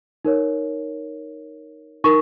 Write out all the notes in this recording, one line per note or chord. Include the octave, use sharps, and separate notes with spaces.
D#4 A#4 C#5
D#4 A#4 C#6